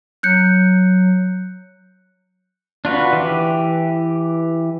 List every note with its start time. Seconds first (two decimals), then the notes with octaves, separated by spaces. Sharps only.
0.23 F#3 F#6 G6 C#7
2.85 D4 F4 F#4 B4
3.13 E3 G4